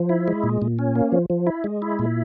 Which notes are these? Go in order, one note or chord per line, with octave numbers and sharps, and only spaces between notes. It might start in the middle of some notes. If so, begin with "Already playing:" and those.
Already playing: F3
E4
G#3
A#2
A#2
C#4
A#3
F3
F3
E4
G#3
E4
A#2